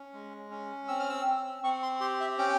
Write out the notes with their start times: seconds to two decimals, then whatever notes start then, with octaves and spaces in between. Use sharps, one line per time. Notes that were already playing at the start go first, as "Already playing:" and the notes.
Already playing: C#4
0.14 G#3
0.51 C#4
0.88 C4 E6
1.00 F6
1.10 E6
1.26 C4
1.63 C4 C#6
1.82 C6
2.01 G4 C6
2.20 E5
2.38 C#4 G5